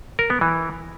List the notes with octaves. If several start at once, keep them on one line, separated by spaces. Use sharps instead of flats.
A#4
B3
E3